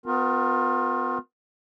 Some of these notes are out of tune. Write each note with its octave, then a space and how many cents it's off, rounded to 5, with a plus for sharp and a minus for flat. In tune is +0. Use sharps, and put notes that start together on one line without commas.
B3 +35 F4 +35 A#4 +0